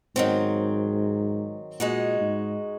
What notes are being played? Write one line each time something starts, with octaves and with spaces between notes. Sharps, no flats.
G#2 D#3 F#3 C4
A#2 G#3 D#4 F#4
G#2